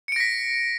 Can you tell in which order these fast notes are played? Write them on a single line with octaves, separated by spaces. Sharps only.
C#7 D7 A#6 B6